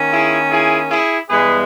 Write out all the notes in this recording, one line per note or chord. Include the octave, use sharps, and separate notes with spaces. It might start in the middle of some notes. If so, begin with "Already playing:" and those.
Already playing: D#3 A#3 C#4
E4 G#4
E4 G#4
E4 G#4
G2 E3 G#3 B3 G#4 B4